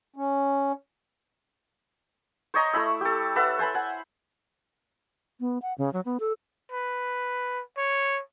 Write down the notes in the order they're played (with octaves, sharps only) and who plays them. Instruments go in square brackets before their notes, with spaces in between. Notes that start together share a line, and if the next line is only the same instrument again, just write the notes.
[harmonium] C#4
[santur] C5 C#5 D#5 A#5
A3 E4 B5 E6
G4 A4
A4 B4 E5 F#5
C5 G#5 A5 B5
F#5 G#5
[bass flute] B3
F#5
C#3
F#3
B3
A4
[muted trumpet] B4
C#5